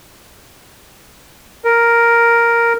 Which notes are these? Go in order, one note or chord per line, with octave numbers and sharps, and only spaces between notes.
A#4